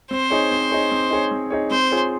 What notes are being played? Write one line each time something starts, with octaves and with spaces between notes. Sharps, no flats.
C4 C5
D#4 G#4 C#5
C4
D#4 G#4 C#5
C4
D#4 G#4 C#5
C4
D#4 G#4 C#5
C4 C5
F4 G#4 C#5